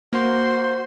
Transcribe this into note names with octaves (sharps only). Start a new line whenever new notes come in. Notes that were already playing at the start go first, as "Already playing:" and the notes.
A#3 F#4 C5 C6